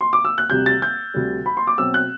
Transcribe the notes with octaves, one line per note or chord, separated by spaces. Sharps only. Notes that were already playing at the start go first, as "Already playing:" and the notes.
C6
D6
E6
F#6
D2 C3 G3 G6
A6
G6
D2 C3 G3
B5
C6
D6
B2 F#3 C4 E6
F#6